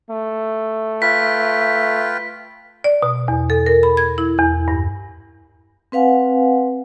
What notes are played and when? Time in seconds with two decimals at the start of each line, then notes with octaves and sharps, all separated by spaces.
0.10 A3
1.02 F4 B4 G5 B6
2.84 D5
3.03 B2
3.28 E2
3.50 A4
3.66 A#4
3.83 B5
3.97 G#6
4.18 E4
4.38 E2
4.68 G2
5.92 C4 B4 F5 F#5 G#5